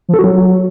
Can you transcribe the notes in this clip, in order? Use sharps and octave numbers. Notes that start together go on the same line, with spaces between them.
F3
A4
F#4
F#3